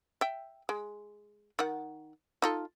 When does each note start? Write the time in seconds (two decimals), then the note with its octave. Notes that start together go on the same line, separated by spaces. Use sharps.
0.21 E5 G5
0.69 G#3
1.59 D#3 F#5
2.42 D#4 F4 A4